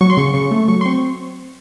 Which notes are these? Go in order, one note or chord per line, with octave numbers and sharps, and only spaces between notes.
F#3 C#6
C6
C#3 C#6
C#3 C#6
A3
F#3 C#6
C6
C4 C#6